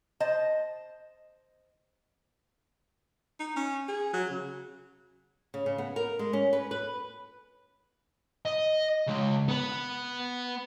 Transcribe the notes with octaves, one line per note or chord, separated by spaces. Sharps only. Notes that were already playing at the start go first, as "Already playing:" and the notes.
C5 D#5 A5
D#4
C#4
G#4
F#3
C#3
C#3
C#3
B3
A#4
G#3
C#4
B4
B4
D#5
C#3 G#3
B3 B4